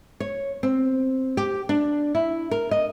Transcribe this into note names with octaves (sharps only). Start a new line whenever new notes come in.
C#5
C4
G4
D4
E4
A#4
D#5